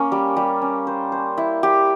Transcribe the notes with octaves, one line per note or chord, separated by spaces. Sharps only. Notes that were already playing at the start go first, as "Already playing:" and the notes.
Already playing: A#3 C#4
G3
G3
C#4
C5
C5
E4
G4